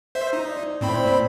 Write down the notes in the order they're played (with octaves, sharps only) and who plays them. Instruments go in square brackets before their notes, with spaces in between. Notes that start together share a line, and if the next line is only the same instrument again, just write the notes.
[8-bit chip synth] C5 E5
D#4
[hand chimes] D5
[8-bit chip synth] A2 C4 B5
[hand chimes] A#3 C5 D5